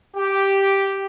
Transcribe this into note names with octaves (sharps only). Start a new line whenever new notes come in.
G4